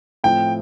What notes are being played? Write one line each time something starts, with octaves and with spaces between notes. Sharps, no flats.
A2 F3 C4 G5